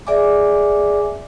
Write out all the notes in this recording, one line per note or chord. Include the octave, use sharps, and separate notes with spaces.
G#4 D5 E5 G#5 D6